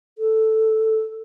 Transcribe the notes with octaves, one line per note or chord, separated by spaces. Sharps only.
A4